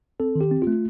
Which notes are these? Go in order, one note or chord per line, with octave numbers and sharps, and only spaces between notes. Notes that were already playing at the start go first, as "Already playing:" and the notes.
C4 A4
D#3
G4
C4
A3 F4